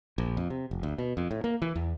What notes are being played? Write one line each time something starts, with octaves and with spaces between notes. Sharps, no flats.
A#1
F2
C3
F1
D2
B2
F2
A2
A#3
E3
E2